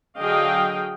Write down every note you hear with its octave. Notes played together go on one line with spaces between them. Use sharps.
D3 F#3 G#4 D#5 F5 G5